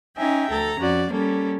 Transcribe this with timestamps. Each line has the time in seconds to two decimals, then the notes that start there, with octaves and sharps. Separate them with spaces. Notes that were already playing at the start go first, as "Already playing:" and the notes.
0.16 C#4 D#4 E5 G5 G#5
0.49 D2 A4 A#5
0.79 F2 C#4 F#4 D5
1.10 G3 A#3 C#4 A4